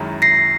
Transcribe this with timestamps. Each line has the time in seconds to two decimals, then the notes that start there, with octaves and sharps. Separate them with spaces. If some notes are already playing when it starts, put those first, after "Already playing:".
Already playing: F#2 D#3 G#3 C#4 E4
0.22 A#6 C7